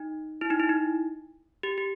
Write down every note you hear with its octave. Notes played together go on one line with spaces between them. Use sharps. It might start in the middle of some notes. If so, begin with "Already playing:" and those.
Already playing: D#4
E4
D#4
E4
D#4
G4
G4